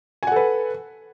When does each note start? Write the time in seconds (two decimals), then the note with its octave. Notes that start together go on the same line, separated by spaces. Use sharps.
0.23 G#5
0.27 F#5
0.32 A4
0.36 B4